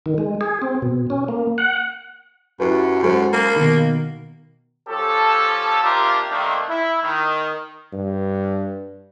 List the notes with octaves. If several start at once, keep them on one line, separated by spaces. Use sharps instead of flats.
D#3
G#3
G#4
C4
B2
C#4
A#3
F#5
F#2 E4 G4 B4
F#2 G#3 A4 C5
A#3
B2 D#3
F3 C#4 G4 A4
C3 A#3 D4 F4 G4 A#4
D#3 A3 A#3 C4 D4
E4
D#3
G2